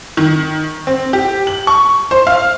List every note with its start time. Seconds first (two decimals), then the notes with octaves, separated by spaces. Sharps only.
0.17 D#3
0.87 C4
1.13 G4
1.47 F#7
1.67 C#6
2.11 C5
2.27 F5